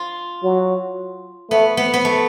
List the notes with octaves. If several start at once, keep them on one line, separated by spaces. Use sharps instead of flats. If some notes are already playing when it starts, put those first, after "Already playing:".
Already playing: F4
F#3
A3 B3
B3
B3
A3